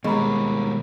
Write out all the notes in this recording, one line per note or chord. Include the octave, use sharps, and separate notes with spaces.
D#2 B2 G3 G#3 A#5 B5 C#6